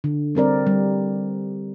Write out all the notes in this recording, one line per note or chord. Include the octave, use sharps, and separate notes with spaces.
D3
G3 C4 A#4 D5
G3